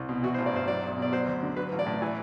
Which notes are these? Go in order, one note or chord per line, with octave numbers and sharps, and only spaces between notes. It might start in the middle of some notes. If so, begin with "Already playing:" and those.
Already playing: C2
B2
E3 F#4
C5
A1
D5
G2 C5
F#3 D5
B1
B2 D5
F#3 C5
D2
D3
F#3 B4
A1
D5
A2
E3